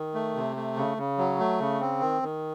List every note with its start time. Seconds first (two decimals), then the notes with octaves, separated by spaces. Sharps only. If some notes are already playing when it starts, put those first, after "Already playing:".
Already playing: D#3
0.14 A3
0.36 C3
0.57 A3
0.76 C#3
0.97 C#3
1.18 F#3
1.39 A3
1.60 C#3
1.80 C4
2.01 D#3
2.23 D#3